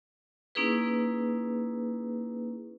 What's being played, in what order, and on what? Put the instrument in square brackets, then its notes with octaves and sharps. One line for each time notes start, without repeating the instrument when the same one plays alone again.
[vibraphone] A#3 C#4 D#4 E4 G#4 B4